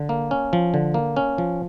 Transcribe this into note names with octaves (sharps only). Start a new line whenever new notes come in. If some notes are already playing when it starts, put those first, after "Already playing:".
Already playing: D3
A#3
C#4
F3
D3
A#3
C#4
F3